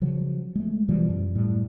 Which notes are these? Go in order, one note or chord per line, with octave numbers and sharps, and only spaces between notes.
C#3 F3 F#3
G#3 A3
B2 E3 F3 G3
F#2
A2 G3